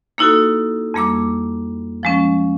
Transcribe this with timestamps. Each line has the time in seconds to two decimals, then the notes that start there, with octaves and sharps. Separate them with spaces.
0.18 A#3 D#4 E4 F#4 A4
0.94 F2 G3 A#3 D6 E6
2.03 F3 G#3 C#4